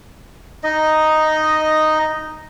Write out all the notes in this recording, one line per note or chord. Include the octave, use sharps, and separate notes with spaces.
D#4 D#5